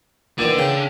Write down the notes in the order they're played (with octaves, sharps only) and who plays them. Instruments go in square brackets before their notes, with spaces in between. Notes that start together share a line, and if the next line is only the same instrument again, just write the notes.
[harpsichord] A#2 D#3 E3 [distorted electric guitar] D4 F#5
[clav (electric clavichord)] C#3 [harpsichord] G5